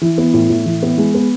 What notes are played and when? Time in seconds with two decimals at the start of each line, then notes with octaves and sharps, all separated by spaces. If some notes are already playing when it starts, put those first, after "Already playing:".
0.01 E3
0.18 B3
0.34 A2
0.50 A2
0.65 E3
0.83 B3
0.98 G#3
1.15 B3